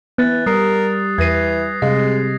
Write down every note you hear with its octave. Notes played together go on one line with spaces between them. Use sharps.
E3 B3 F#6 A6
G3 A#4 D#6 C7
E2 E3 G#6 A#6 C7 D#7
C3 G3 G#3 F5 A#6